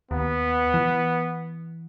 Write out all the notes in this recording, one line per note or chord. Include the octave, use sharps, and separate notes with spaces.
D#2 B3
E3